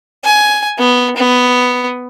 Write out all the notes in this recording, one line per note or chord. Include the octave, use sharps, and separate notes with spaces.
G#5
B3
B3